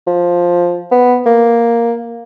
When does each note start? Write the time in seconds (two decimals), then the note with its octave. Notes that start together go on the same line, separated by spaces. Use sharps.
0.07 F3
0.92 B3
1.26 A#3